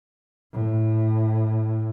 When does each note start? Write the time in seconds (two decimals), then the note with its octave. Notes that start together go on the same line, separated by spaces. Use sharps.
0.53 A2